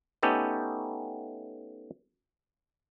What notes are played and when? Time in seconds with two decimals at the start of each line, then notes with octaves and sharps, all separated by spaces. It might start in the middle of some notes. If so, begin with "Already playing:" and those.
0.23 A3 B3 C#4 D#4 G4 A4